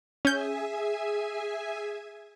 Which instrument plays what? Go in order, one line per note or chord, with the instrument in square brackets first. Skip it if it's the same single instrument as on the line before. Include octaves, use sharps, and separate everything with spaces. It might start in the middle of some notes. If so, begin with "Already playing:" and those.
[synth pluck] C#4 G6 [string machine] G#4 E5 G#5